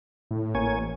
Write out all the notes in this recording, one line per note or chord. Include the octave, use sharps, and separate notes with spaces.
A2
A1 A#3 C#5 G#5